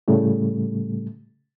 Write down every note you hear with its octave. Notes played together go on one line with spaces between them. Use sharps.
A2 C#3 G3 A3